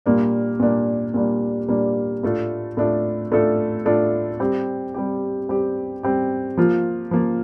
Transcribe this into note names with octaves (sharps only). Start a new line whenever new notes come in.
A#2 G3 A#3 D4
A#2 G3 A#3 D4
A#2 G3 A#3 D4
A#2 G3 A#3 D4
A2 A3 D4 F4 A4
A2 A3 D4 F4 A4
A2 A3 D4 F4 A4
A2 A3 D4 F4 A4
G3 C4 G4
G3 C4 G4
G3 C4 G4
G3 C4 G4
F3 A#3 F4
F3 A#3 F4